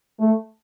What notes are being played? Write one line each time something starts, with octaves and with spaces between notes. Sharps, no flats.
A3